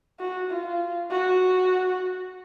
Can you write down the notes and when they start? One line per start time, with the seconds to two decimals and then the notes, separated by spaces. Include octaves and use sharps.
0.20 F#4
0.50 F4
1.11 F#4